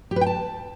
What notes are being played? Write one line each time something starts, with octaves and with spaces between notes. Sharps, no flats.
G4
B4
G5
A5